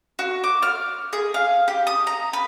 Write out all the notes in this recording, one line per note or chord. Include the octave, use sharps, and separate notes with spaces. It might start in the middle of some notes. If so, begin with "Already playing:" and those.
F#4
D6
F6
G#4
F5
G4
D#6
A#5
B4